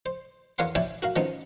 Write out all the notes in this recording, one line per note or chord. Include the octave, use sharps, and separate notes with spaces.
C5
E2 A#4 C#5 F5 F#5 C6
E4 C#5 D5 E5 G5 G#5
F#4 A#4 F5
D#3 F3 B3 C#4 D#4